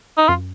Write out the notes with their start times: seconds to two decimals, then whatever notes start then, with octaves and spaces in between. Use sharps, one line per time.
0.17 D#4
0.28 F#2 F4